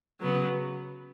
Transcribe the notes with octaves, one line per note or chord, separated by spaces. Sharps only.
C#3 F#3 B3